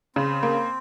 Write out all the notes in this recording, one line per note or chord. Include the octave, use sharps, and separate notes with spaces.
C#3 C4
A#3